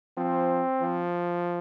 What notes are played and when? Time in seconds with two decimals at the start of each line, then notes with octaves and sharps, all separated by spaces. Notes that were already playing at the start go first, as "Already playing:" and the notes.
0.17 F3 C4
0.82 F3